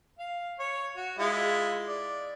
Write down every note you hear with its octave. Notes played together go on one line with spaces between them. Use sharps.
F5
C#5
F#4
G#3 E4 F4
D5